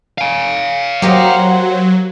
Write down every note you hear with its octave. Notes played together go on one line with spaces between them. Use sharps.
F5 G#5
F#3 A#3 G4 C5 D#5 F#5